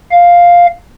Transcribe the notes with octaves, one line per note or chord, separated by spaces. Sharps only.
F5